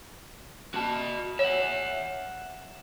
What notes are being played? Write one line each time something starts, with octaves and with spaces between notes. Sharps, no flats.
F#4 A5
C#5 E5 F#5